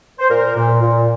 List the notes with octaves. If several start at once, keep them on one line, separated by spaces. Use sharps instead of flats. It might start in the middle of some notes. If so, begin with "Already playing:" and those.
C5
A#2 A#4
A#2
A#2